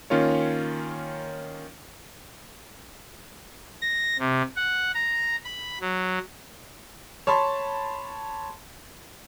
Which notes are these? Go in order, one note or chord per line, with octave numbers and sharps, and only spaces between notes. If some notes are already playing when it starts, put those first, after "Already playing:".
D#3 A#3 C#4 F4 A#4 C#5
A#6
C3
F#5
A#5
B5
F#3
C#5 A5 B5 C6